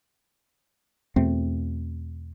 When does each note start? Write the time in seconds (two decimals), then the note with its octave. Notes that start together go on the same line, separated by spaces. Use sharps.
1.16 E2 B2 A3 C4